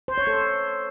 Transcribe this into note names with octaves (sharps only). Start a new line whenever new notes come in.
C5
C#5
A4